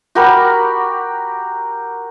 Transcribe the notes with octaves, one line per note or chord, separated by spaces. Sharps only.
F#4 G4 A#4 B5